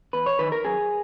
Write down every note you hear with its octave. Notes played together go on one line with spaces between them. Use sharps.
E2 B4
C#5
D#3 B4
A#4
F#2 G#4